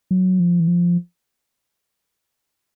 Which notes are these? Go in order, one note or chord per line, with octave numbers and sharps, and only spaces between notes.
F#3
F3
E3
F3